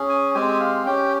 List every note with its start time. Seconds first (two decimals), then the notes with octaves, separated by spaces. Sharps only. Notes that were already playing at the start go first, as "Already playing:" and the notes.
Already playing: C#4 G#4
0.09 G#5
0.34 G#3 C4 G4 G#5
0.60 F5
0.86 C#4 G4 G5